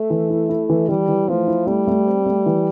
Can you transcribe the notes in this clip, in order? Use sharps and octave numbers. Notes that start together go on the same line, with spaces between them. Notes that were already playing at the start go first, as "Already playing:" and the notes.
Already playing: A3
E3
E4
E4
E3
E3 G3
E3
F3 A3
E4
G3 A3
A3
C4
A3
E3